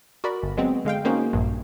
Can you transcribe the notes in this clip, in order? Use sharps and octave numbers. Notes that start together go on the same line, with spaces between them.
F#4 A#4 D5 B5
G1
F#3 G#3 B3 C4
D3 G#3 F5 G5
A#3 C#4 D#4 F#4 G#4 C5
A#1 G2